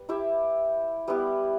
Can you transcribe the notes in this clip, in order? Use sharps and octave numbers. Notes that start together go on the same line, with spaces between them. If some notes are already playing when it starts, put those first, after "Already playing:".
Already playing: G3 B4
E4 G4 E5
G3 B3 E4 G4